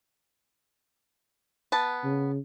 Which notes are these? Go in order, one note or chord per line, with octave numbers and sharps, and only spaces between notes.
B3 A5
C#3